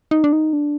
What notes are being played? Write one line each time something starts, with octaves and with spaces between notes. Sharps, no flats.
D#4
D4
D#4
D4